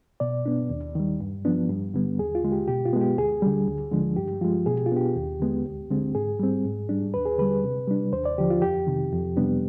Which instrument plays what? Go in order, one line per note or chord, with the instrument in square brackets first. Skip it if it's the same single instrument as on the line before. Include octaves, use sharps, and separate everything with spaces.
[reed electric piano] B2 D5
B3 D4
D#2
D#3 G3
G2
F3 B3 D4
G2
D3 G3 B3
D#2 G#4
F4
D3 G#3
G4
B2 G4
F4
G#3 B3
G4
D2 G#4
D3 G3
D2
D3 F3 G#3 D4
G2 G4
F3 G#3 F4
B2 G#4
G4
F4
B3 D4 G4
D#2
D3 G#3 B3
D2
D3 G#3 C4
G#2 G#4
G3 C4
G#2
G3 D4
D#2 B4
G#4
D3 G3 B4
C3
G3 D4
D#2 C5
D5
D3 F3 G4
F4
F2 G4
C3 D#3
F2
C3 G3 B3 D4